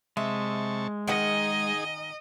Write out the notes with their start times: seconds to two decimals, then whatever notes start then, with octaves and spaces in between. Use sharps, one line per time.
0.17 C3 G#3 E5 A5 C#6
1.07 D#3 D#4 G#4 D#5 F#5 G#5